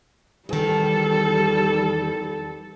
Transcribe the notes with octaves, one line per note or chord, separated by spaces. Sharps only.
E2 D#3 G3 A4